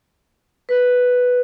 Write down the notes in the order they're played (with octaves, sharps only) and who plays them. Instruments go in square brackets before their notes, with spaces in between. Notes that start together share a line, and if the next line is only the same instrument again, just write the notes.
[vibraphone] B4